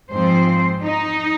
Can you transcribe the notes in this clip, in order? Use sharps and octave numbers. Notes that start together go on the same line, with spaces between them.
G#2 F3 C4 C5
D#4